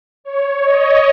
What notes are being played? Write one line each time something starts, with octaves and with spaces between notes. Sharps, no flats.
C#5
D#5